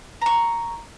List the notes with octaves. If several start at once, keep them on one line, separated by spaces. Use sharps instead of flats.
A#5 C#6